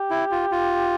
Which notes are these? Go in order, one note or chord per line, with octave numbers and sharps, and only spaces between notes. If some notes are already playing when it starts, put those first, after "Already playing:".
Already playing: G4
E4
F4
F4